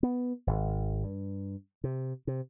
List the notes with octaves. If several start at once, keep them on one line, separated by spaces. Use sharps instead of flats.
B3
G#1
G2
C3
C3